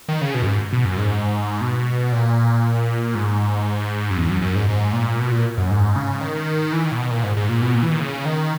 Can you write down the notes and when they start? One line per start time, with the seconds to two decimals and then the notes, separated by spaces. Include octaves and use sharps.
0.09 D#3
0.21 C#3
0.35 B2
0.42 F#2
0.46 G#2
0.73 B2
0.85 F#2
0.98 G#2
1.61 B2
2.12 A#2
3.15 G#2
4.10 F#2
4.17 E2
4.30 F#2
4.42 F#2
4.55 G#2
4.69 G#2
4.93 A#2
5.19 B2
5.32 A#2
5.58 F#2
5.71 G#2
5.96 C#3
6.21 D#3
6.73 E3
6.85 D#3
6.92 A#2
6.97 B2
7.11 A#2
7.24 G#2
7.37 G#2
7.49 A#2
7.62 B2
7.75 A#2
7.83 E3
7.91 D#3
8.00 C#3
8.25 D#3